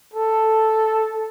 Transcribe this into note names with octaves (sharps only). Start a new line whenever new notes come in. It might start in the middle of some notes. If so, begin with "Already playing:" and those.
A4